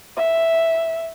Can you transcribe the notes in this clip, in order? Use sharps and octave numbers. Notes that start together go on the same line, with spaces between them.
E5